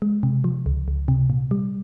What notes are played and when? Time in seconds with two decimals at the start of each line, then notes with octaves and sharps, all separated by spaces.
0.02 G#3
0.23 C3
0.44 F3
0.66 C#2
0.88 C#2
1.08 C3
1.30 A#2
1.51 G3